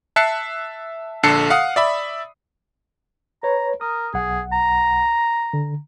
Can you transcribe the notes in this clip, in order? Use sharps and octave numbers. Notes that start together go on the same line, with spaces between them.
E5 A5 F#6 C7 C#7
A#1 D3 A4 A5 C7 C#7
F5 F#5 D#6
D5 E5 B5
B4 C#5 A#5
A#4 D#6
B1 G#4 F#5
A#5
D3